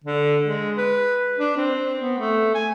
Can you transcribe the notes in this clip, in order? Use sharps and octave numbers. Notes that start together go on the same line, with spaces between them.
D3
G#3
B4
D4
C4
B3
A3
G#5